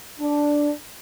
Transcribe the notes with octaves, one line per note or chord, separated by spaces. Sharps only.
D4